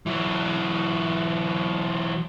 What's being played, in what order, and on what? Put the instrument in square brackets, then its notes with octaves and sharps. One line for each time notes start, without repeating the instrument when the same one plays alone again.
[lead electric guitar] E3 F#3